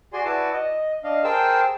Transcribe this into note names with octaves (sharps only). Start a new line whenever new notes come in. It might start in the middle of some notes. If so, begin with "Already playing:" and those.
F#4 G#4 D5 G#5 C6
E4 F#4 B4 D5 F#5 A5
D#5
D4 D#5 F5
G#4 A#4 C5 G5 A5 E6